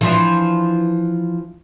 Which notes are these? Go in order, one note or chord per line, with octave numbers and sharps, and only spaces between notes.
E3 F3 D4